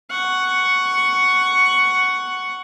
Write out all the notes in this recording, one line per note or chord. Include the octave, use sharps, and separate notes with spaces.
F#5 C#6